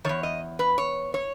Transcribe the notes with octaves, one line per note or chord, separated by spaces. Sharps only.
E2 D#3 C#5
D#5
B4
C#5
C#5